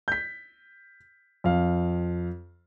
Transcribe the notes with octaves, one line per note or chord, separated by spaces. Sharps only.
G6 B6
F2 F5